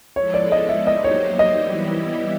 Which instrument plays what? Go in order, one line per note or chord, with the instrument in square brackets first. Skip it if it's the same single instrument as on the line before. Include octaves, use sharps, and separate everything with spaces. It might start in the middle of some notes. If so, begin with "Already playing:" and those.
[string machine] F3 G#3 B3 E4 A4 [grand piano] C#5
[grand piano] D5
D#5
E5
[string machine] F#3 A#3 D#4 G4 C5 [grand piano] D#5
[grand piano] C#5
D#5
[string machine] E3 G3 B3 E4 G4